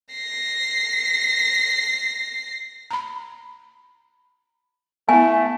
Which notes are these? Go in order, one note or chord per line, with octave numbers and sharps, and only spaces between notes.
A#6 C7
A#5 B5
A3 B3 E4 G#5